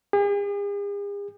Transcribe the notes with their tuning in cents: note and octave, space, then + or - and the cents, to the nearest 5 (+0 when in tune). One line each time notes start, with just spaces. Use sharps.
G#4 -45